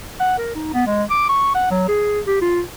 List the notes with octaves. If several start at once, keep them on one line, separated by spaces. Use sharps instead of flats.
F#5
A#4
D#4
B3
G#3
D6
C#6
F#5
F#3
G#4
G4
F4